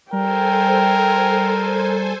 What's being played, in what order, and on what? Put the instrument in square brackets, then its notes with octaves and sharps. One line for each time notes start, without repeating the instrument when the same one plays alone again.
[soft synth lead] G3 [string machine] A4 C5 G#5 [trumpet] A#4 [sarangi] G5